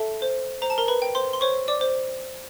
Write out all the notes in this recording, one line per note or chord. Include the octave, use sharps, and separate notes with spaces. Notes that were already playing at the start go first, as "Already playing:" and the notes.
Already playing: A4 E5 A5
C5
C5 A#5
A5
A#4 A#5
B4 B5
G5
C5 C6
C6
C5 C#5 C#6
D5 D6
C5